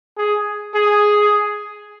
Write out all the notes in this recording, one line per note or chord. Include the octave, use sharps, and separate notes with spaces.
G#4
G#4